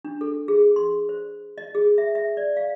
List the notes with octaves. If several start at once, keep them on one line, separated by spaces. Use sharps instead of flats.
D4
A4
G#4
C6
C5
D#5
G#4
E5
E5
D5
F5